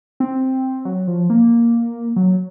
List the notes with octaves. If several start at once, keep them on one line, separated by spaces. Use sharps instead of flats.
C4
F#3
F3
A#3
F#3